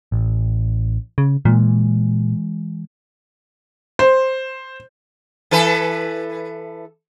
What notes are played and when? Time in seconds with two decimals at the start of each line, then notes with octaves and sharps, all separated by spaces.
0.12 A1
1.18 C#3
1.45 A#2 E3 G#3
3.99 C5
5.51 E3 A4 B4